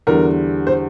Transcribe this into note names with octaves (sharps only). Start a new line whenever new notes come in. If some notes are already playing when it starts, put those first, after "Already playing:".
E2 D3 G3 A#4
C5